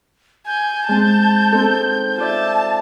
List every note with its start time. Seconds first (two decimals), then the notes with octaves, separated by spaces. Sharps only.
0.47 G#5 G6
0.88 G#3 C4 A5
1.52 C4 D#4 A4
2.18 F4 D5 E5 A5